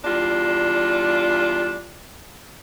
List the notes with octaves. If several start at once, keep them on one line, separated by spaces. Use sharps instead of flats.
E2 G3 D4 F4